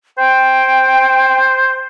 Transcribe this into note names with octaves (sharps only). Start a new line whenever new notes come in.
C5 G5